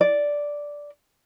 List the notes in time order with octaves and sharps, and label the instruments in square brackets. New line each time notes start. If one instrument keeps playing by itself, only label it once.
[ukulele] D5